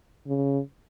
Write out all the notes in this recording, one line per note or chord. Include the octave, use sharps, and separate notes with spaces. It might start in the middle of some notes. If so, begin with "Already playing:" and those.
C#3